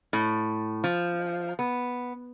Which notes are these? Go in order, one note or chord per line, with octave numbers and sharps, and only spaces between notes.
A2
F3
B3